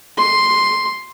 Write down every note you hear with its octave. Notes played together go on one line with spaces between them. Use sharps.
C6